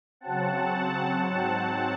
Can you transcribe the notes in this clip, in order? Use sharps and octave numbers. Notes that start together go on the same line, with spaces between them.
C#3 F#3 C4 F#5 A5
G#2 F#3 C4 F#5 A5